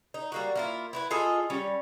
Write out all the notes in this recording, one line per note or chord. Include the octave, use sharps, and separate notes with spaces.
D#4
G3 A#3 F#4
A#3 E4 F4
E4 F#4 B4
F4 G#4 A4 D#5
G3 C#4